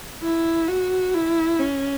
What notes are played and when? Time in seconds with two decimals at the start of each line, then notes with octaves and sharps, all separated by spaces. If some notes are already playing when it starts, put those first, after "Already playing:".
0.23 E4
0.68 F#4
1.14 E4
1.60 C#4